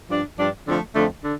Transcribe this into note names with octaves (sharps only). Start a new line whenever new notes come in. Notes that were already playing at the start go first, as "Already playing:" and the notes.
G2 F3 D4
G2 F3 D4
F2 D3 F3 A3
F2 D3 F3 A3
D3